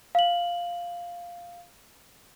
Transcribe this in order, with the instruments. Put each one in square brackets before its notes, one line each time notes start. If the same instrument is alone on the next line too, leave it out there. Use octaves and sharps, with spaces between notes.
[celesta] F5 F#7